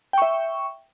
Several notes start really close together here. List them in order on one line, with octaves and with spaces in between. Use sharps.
G5 C#6 E5